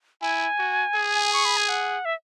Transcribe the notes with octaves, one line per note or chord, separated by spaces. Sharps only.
E4 G#5
F#4
G#4
C#6
B5
G#5
F#5
E5